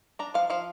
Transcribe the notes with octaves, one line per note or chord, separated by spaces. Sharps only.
D4 A#5
F3 F5
F3 F5